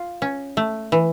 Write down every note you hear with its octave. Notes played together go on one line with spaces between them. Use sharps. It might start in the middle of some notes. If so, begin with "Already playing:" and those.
Already playing: F4
C#4
A3
E3